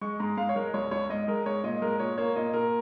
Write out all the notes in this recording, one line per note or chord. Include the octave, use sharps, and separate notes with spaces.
G#3 C#6
G#2 A#5
G#2 F5
C#5
G#3 A#4
C#2 C#5
C#2 C#5
G#2 D#5
G#3 A#4
G#2 C#5
A#2 D#5
G#3 A#4
A#2 C#5
A#3 C#5
A#2 D#5
A#2 A#4